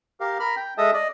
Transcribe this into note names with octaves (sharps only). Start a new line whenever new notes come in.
G4 A#4 F5
A#4 B5 F6
G5
G#3 A4 D#5 E5 A5 D#6
D5 D#5